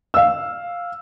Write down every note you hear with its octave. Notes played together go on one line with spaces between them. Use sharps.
F5 E6